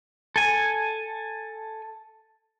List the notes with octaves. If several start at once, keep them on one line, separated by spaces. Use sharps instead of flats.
A4 G#5